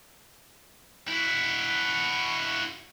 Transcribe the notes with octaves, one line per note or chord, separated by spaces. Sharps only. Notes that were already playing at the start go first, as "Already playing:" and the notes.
E4 F#4